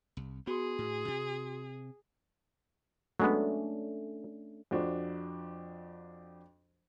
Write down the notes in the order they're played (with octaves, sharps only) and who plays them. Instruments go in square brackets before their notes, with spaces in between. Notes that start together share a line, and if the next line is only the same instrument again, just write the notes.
[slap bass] C2
[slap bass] B3 [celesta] F#4 C6 [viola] G#4
[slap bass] A2
C3
[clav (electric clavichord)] F#3 G#3 B3 [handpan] A3 C#4 D4
[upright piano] F2 F3 D4 F#4 C5